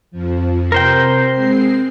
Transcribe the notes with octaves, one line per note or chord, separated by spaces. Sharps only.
F2 F3
C3 A#4 C5 G5
G#3 C4 C7